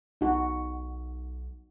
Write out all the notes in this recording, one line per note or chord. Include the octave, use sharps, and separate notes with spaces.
B1 D#4 F#4